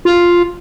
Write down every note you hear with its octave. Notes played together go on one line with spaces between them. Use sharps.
F4